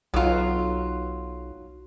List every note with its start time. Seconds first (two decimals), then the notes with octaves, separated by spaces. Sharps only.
0.14 B1 F#3 F4